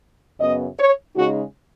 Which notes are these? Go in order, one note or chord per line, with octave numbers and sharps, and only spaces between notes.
F#2 C#3 B3 D#5
C#5
C#3 G#3 D#4 F#4